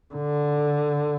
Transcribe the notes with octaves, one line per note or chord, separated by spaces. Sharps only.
D3